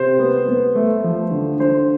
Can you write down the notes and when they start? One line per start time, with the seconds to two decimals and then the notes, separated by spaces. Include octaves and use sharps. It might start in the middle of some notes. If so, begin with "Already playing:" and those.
Already playing: C3 C5
0.19 B3
0.48 B3
0.75 A3
1.04 F3
1.31 D3
1.60 D3 C5